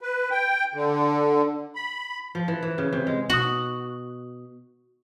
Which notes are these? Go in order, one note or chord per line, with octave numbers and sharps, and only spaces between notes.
B4
G5
D3
B5
F3
E3
E3
C#3
C3
G#3
B2 F#4 D#6 F#7